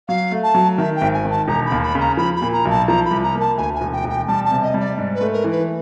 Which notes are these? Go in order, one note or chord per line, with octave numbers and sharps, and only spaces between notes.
F#3 F5
A3
A5
F#3
D#3 E5
G5
G#1
G#5
D#3
A5
E1 A#5
B5
D#2
B5
C#3
A#5
F3 B5
B5
A#2
A#5
B1
A5
F3 A#5
B5
C2
A#5
A#3
A5
D2 G#5
G#5
E1
G5
E1
G5
G3 A5
A5
C3
D#5
G3
D5
G#2
B4
A3
A#4
E3
B4